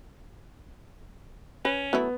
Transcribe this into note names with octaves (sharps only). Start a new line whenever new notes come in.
C#4 B4
F#3 A3 B3 E4